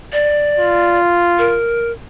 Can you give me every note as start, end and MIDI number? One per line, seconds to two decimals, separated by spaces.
0.12 0.99 74
0.59 1.60 65
1.39 1.91 70